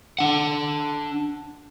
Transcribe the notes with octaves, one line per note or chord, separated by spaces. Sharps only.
D4 F#5